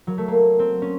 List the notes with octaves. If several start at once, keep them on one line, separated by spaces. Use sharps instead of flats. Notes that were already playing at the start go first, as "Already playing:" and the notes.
F#3
A3
A#3
C4
C#4